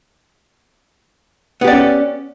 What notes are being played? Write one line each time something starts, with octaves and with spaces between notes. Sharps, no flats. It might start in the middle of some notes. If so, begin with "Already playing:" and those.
B3 C#4 G4 D5